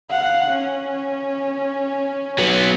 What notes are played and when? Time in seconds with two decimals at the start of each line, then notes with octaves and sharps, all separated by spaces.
0.10 F5 F#5
0.50 C#4
2.38 F#3 B3